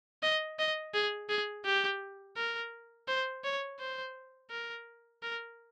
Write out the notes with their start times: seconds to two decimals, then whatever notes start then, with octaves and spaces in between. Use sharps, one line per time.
0.23 D#5
0.59 D#5
0.94 G#4
1.29 G#4
1.65 G4
2.37 A#4
3.08 C5
3.44 C#5
3.79 C5
4.50 A#4
5.23 A#4